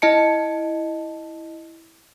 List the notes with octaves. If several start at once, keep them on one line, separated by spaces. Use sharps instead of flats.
E4 D#5 A5 C#7